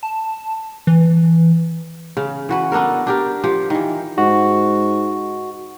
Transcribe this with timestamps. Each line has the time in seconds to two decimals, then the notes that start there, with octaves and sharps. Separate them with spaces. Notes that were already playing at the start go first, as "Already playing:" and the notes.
0.03 A5
0.87 E3
2.17 C#3
2.49 E3 F#4 B4
2.72 B3 D4 A4 A#4
3.07 D4 G4 A#4
3.44 F3 G4
3.70 D#3 E3
4.18 G#2 F#4